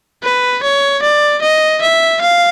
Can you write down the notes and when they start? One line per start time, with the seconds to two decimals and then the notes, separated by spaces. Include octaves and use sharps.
0.23 B4
0.63 C#5
1.03 D5
1.42 D#5
1.82 E5
2.21 F5